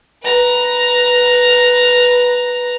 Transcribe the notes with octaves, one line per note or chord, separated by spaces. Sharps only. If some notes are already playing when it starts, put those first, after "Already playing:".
B4 A#5